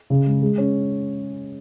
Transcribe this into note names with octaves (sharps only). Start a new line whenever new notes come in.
C#3
G#3
G#3
C#4